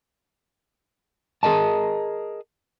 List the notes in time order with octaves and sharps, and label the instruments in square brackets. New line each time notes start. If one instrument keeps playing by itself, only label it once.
[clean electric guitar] G#4 A#4 D#5 A5